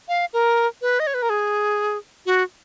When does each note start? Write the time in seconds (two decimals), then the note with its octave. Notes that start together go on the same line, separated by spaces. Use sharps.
0.09 F5
0.33 A#4
0.82 B4
1.00 D#5
1.07 C#5
1.14 B4
1.22 A#4
1.30 G#4
2.26 F#4